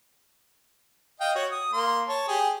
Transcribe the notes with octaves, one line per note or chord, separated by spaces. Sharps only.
D#5 F5 G5
F#4 C#5
D#6
A#3 C6
C#5 A5
G4 G#4